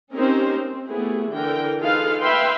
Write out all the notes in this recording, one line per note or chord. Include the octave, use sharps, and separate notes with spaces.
C4 C#4 D#4 G4 A#4 C5
C4
A3 B3 E4 G4 G#4
D3 E3 A#4 G5
D#4 F4 G#4 A4 B4 F5
B4 E5 F5 G5 B5 C6